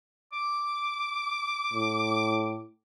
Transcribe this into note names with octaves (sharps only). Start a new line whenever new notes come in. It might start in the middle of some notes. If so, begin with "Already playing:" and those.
D6
A2